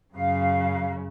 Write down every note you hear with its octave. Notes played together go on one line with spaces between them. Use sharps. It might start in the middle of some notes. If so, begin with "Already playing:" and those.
F#2 C#3 F5